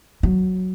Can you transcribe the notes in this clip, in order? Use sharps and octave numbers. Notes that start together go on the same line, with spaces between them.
F#3